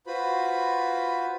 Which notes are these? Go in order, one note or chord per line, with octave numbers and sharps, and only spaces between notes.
F4 F#4 B4 C5 B5